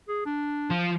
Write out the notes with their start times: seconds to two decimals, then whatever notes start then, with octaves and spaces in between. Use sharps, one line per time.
0.08 G#4
0.26 D4
0.70 F3 F4